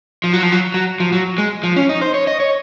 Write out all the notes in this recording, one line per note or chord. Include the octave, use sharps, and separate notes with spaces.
F3
F#3
F3
F#3
F#3
F3
F#3
G#3
F3
C#4
D#4
C5
C#5
D#5
C#5